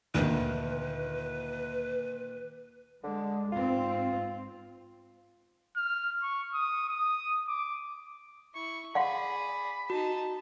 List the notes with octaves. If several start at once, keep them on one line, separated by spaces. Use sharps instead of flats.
D2 A#2 D#3 B4
D3 G#3
G#2 C4 F4
F6
C#6
D#6
D#6
D6
E4 C#6
G#4 D5 F5 F#5 B5 C6
D#4 F#4 A5